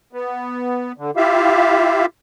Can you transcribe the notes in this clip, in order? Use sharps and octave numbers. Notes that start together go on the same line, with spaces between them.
B3
D3
E4 F4 G4 E5 F5